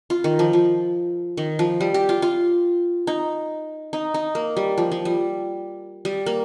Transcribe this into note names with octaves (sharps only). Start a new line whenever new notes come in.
F4
D#3
F3
F3
D#3
F3
G3
G4
F4
F4
D#4
D#4
D#4
A#3
G3
F3
F3
G3
G3
A#3